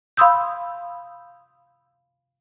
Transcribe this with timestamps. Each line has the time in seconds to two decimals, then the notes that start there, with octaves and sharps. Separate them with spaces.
0.17 F5 B5 C6 D#6 E6 G6